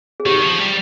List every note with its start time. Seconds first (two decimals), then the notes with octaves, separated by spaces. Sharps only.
0.20 G#4
0.26 D#3 G4
0.42 F3
0.59 G3